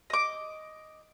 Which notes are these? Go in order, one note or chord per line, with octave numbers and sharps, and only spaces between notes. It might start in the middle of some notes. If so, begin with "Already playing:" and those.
D#5 D6